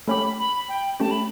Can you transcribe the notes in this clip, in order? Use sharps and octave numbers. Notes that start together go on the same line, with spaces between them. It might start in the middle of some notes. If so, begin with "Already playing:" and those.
A3 C#4 G4 B5
B5
G5
A3 C#4 G4 A5
B5